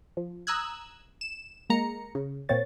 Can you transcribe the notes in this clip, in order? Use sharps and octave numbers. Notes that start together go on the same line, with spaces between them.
F3
A#5 D#6 E6 F#6 G#6
E7
G#3 A#3 A#5 C#7
C#3
A#2 A#3 C4 C#5 A6